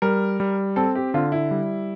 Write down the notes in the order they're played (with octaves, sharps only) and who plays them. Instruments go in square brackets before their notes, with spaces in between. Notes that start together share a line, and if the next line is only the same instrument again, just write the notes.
[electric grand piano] G3 [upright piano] A#4
[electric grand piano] G3
[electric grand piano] C4 [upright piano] A4
[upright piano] G4
[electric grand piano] D3 [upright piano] F4
[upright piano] E4
[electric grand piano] G3